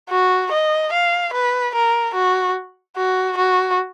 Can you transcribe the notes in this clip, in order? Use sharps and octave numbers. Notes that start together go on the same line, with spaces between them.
F#4
D#5
F5
B4
A#4
F#4
F#4
F#4